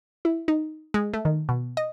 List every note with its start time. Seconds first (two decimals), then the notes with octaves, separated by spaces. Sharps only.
0.25 E4
0.48 D#4
0.94 G#3
1.14 A3
1.25 D#3
1.49 B2
1.77 D#5